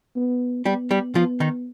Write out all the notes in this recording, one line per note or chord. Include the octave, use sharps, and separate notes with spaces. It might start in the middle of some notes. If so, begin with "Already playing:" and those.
B3
G3 B3 G4
G3 G4
F3 B3 F4
D#3 D#4